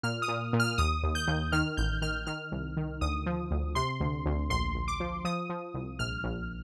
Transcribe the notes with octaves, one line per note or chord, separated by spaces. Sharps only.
A#2 F6
D#6
A#2
A#2
F6
D#2 D#6
D#2
G6
D#2
D#3 F6
A1 G6
D#3 F6
D#3 F6
C2
D#3
D2 D#6
F3
D2
C3 C6
D2
D2
A#1 C6
A#1
D6
F3
F3 D#6
F3
C2
A#1 F6
A#1